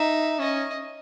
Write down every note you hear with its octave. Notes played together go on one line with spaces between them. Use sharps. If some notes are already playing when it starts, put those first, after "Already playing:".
Already playing: D#4 E5
C#4 D#5